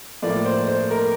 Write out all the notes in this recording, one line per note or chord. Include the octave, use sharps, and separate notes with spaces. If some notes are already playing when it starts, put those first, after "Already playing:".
A2 F3 A#3 D5
C5
C5
A#4